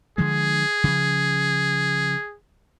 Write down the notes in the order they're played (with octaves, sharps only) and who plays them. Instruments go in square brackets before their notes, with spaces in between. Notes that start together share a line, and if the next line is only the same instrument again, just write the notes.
[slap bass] D3 F3 G#3 [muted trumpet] G#4
[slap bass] C#3 F3